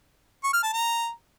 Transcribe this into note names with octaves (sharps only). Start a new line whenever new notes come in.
C#6
F6
A5
A#5